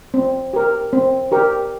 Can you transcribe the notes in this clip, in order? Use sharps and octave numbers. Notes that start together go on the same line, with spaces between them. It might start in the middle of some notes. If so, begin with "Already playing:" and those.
C4
G4 A#4
C4
G4 A#4